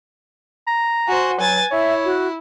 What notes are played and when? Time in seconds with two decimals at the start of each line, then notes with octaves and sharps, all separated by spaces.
0.67 A#5
1.07 F#4 C5 G#5
1.39 F#3 B4 G#5 A6
1.71 E4 C#5 E5
2.04 F#4